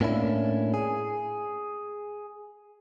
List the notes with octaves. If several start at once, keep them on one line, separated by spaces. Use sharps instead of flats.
A2 A#3 C#4 D4 E4
G#4